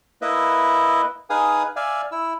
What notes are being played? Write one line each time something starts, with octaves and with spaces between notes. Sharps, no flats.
A#3 E4 B4 D#5 E5
D#4 G#4 B4 F5 G#5 D#6
D5 E5 F5 G#5
E4 E6